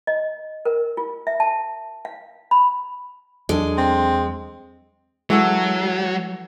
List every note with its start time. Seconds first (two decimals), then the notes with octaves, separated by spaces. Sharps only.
0.07 D#5
0.65 A#4
0.97 F4
1.27 E5
1.40 A5
2.05 F5
2.51 B5
3.49 E2 F#3 G#3 D4 G#4 A4
3.78 C4
5.30 E3 F#3 G#3 F#4 A4